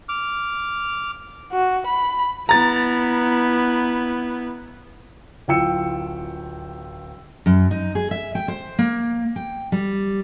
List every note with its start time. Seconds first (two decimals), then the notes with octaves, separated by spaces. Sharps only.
0.09 D6 F6
1.52 F#4
1.87 B5
2.49 B3 E4 A#5 A6
5.48 D1 F4 G5 E6 C#7
7.46 F#2
7.71 D#4
7.95 G#4
8.11 E5
8.35 G5
8.48 C5
8.79 A#3
9.36 G5
9.72 G3